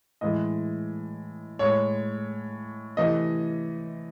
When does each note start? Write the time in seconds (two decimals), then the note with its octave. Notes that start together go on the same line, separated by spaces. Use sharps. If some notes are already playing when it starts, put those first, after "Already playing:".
0.21 A2 E3 G#3 D#5
1.59 A2 G#3 C#5
2.97 C3 E3 A3 D#5